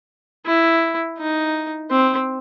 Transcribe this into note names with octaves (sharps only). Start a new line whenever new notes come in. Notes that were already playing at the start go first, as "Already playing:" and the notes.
E4
D#4
C4